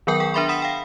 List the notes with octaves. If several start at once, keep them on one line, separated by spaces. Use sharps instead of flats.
D#3 F#3 B3 A#4 G5 G6
G#4 G5
D4 A#4 E5 B5 C6
F#5 B5 D#6 B6 E7
F5 G5